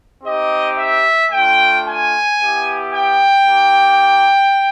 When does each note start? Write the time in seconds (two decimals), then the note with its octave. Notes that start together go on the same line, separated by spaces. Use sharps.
0.24 C4 D#4 G4 D#5
0.78 E5
1.31 A3 D4 F4 G5
1.85 G#5
2.38 B3 E4 G4
2.93 G5
3.46 A#3 D#4 G4